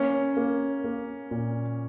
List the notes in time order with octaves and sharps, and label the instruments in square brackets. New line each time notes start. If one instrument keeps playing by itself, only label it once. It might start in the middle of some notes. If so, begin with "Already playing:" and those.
Already playing: [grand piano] A#3 [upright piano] C#4
[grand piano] A#3
A#3
A#2